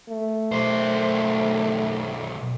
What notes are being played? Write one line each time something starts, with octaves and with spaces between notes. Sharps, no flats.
A3
B1 C5